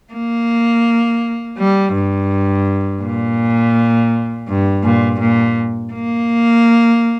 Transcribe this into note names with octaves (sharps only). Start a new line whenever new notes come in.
A#3
G3
G2
A#2
G2
A#2
A#2
A#3